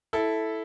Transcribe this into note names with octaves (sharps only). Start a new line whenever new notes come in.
E4 A4